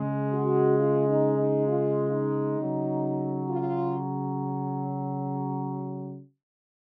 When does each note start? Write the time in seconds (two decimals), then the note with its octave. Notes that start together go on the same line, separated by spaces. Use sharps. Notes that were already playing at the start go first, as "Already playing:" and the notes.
Already playing: C#3 G#3
0.32 F#4
0.78 F4
1.08 D#4
1.37 D#4
1.67 F4
2.12 D#4
2.58 C#3 F#3
3.48 F4